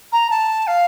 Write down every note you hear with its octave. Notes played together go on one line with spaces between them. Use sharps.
A#5
A5
F5